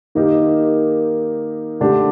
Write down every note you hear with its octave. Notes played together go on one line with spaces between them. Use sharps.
D#3 A#3 D#4 G4 A#4
D3 A3 D4 G4